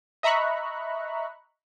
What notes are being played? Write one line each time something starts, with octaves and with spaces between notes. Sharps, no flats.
D#5 E5 A#5 B5 C#6 F#6